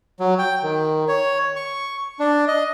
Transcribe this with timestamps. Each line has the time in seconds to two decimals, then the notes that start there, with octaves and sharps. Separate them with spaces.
0.20 F#3
0.39 G5
0.63 D#3
1.08 C#5
1.56 C#6
2.19 D4
2.48 D#5